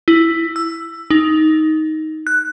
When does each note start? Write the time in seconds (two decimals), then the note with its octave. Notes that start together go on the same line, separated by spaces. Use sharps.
0.08 E4
0.56 E6
1.10 D#4
2.27 F#6